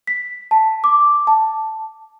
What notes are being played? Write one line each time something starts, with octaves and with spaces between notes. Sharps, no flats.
B6
A5
D6
A5